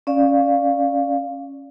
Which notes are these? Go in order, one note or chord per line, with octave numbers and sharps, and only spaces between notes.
C#4 D5 F5